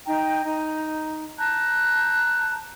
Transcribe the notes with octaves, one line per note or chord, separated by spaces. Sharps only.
D#4 G5 A#5
D#4
A5 A#5 F#6 G6